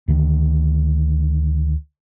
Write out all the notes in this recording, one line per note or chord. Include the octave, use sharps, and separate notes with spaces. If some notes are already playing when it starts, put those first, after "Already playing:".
D2 D3 D#3